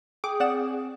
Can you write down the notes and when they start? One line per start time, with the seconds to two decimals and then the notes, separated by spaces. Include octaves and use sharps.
0.24 G#4 G5 D6
0.40 C4 D5 F#5 E7